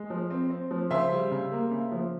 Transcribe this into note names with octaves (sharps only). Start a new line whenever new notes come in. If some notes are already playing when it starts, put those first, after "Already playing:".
Already playing: G#3
F3
C4
C4
F3
C#3 C5 E5
G3
C#3
A#3
C#3
F3